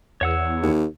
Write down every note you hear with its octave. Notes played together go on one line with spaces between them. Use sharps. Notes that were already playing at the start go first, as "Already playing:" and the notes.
E2 C#5 F#5 E6
D#2